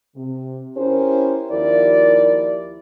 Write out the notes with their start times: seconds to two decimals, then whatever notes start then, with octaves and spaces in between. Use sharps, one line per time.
0.16 C3
0.77 C#4 E4 G4 A#4 C5
1.51 D#2 F3 E4 G4 A#4 D5